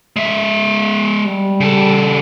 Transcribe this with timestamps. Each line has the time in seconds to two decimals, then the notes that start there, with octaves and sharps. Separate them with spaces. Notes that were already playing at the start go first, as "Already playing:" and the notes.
0.16 G#3 E5
1.26 G3
1.60 C#3 A4